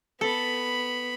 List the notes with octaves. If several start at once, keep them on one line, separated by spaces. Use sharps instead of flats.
B3 A4 B5